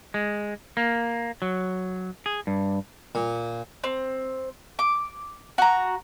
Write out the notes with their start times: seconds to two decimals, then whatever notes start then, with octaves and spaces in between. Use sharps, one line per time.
0.14 G#3
0.77 A#3
1.42 F#3
2.26 G#4
2.47 G2
3.15 A#2
3.84 C4
4.79 D6
5.58 F#4 A#5